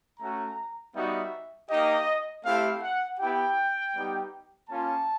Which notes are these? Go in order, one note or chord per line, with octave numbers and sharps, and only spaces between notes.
A3 C#4 F#4 A#5
G3 B3 D#4 F#4 E5
A#3 D#4 G4 D#5
A3 C4 E4 G4 F5
F#5
B3 E4 G4 G5
G3 B3 D#4 G4
A#3 C#4 F4 A5